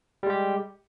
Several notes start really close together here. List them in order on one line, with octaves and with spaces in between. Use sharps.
G3 G#3 G4